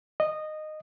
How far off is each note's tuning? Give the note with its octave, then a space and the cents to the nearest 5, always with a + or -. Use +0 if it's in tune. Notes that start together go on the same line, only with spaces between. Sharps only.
D#5 -15